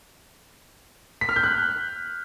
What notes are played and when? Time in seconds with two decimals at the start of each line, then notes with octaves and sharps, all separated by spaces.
1.21 B6
1.29 F6
1.36 G6
1.44 F#6